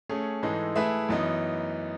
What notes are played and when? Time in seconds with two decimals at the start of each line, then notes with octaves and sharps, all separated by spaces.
0.09 A3 C#4 G#4
0.43 G#2 E3 G#3 D#4 A4
0.76 A3 E4 G#4 B4 E5
1.09 F#2 E3 B3 D#4